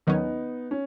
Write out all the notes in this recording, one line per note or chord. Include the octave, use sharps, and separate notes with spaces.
D#2 D#3 F#3 B3 C#4 D#4
C#4